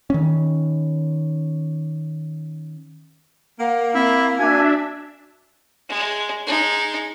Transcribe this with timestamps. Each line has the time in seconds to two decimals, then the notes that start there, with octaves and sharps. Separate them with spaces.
0.10 D#3 C#4
3.59 A#3 F#5
3.95 C4 E4
4.39 D4 F#4 E5 G#5
5.89 G#3
6.46 G#3 D#4